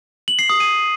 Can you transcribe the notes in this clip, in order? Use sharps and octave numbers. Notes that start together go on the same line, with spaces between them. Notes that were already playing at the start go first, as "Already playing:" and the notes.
F#7
C7
D#6
D#7